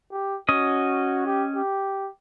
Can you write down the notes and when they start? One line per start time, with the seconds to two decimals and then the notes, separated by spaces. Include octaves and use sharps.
0.12 G4
0.49 C#4 F#4 D#5
1.26 G4
1.56 G4